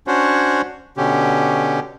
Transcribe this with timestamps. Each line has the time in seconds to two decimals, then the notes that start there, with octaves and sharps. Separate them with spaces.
0.07 C#4 D4 F#4 C5 C#5
0.97 B2 D3 C#4 G4